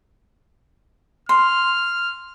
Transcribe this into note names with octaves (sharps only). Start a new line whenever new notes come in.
C6 F6